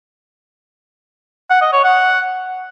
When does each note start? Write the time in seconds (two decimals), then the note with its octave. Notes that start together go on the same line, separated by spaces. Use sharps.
1.50 F#5
1.61 D#5
1.73 C#5
1.84 F#5